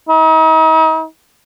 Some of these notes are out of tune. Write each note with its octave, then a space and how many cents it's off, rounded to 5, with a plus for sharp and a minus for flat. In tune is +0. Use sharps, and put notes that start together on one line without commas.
D#4 +40